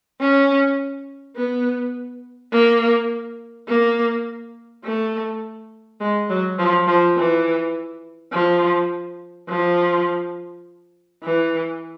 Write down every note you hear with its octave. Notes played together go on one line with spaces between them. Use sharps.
C#4
B3
A#3
A#3
A3
G#3
F#3
F3
F3
E3
F3
F3
E3